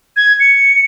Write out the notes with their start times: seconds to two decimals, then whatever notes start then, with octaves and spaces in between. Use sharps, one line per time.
0.17 G#6
0.40 C#7